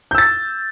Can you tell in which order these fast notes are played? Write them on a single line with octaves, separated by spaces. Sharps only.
G6 E6 A6